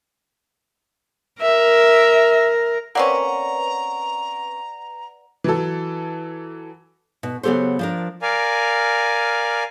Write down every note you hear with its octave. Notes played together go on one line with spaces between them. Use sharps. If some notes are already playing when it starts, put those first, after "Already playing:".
A#4 E5
A#3 C4 C#4 B4 D5 F#5 A#5
E3 F#3 A4
B2
C#3 F#3 B3 G4 A4 C5
F3 D4 A#4
A#4 D5 F5 G#5